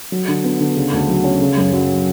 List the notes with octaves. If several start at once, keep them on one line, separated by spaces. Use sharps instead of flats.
F#3
D3
B3
D3
C#3
D2
F#3
C#4
C#3
F#2
F#3